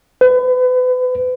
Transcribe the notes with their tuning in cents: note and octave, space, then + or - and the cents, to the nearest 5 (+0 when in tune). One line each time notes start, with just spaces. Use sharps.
B4 +35